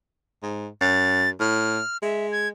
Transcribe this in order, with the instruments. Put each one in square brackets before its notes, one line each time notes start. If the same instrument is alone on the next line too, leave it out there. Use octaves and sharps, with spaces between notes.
[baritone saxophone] G#2
[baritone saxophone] F#2 [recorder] A6
[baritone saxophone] A2 [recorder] F6
[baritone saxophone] G#3 [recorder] E5
[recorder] G#6